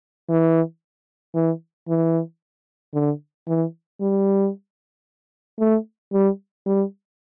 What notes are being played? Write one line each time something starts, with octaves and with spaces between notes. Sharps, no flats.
E3
E3
E3
D3
E3
G3
A3
G3
G3